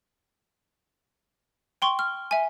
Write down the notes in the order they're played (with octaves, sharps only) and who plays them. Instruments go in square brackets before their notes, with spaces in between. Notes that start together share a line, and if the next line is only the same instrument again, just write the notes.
[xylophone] G5 C6 C#6
F6
E5 G#5